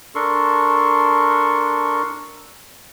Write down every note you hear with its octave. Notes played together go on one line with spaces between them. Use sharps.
D4 A4 A#4 C6 C#6